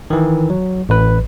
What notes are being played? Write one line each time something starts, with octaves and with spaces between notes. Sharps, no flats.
D#3 E3
F#3
A1 B4